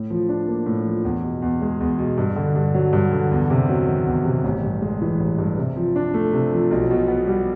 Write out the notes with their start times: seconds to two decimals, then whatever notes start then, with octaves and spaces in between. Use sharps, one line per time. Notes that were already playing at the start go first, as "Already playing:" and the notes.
Already playing: A2
0.10 F3
0.29 D4
0.47 A#3
0.66 A2
0.86 F3
1.04 E2
1.23 B2
1.42 E2
1.62 G#3
1.80 E2
1.99 B2
2.18 G2
2.36 D3
2.56 G2
2.74 F#3
2.93 G2
3.12 D3
3.31 E2
3.50 C3
3.69 F#3
3.87 D#3
4.06 E2
4.25 C3
4.44 A1
4.63 G2
4.82 G#3
5.01 E3
5.20 A1
5.38 G2
5.57 C3
5.76 F3
5.96 D4
6.14 A3
6.33 C3
6.52 F3
6.71 B1
6.90 B2
7.08 B3
7.27 G3